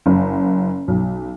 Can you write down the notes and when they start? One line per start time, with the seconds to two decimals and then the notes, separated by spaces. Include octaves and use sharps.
0.06 F#1
0.88 B1